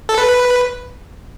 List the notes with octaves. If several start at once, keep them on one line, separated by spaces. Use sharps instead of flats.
A4
B4